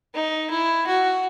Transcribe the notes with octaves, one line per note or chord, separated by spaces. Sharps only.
D#4
E4
F#4